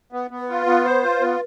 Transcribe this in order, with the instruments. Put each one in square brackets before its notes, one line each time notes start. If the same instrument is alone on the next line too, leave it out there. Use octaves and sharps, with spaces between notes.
[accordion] B3
B3
[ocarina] B4
[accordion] F4
B3
C5
F4
B3